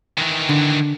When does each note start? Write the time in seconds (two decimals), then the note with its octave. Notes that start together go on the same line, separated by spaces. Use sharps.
0.18 D#3 E3
0.49 D3